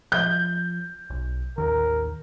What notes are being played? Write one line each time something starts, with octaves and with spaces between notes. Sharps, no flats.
F3 G6
B1
A1 D#2 D#3 A#4